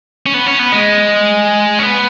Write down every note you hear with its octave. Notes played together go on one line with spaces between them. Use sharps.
C#4
B3
C#4
B3
G#3
C#4
B3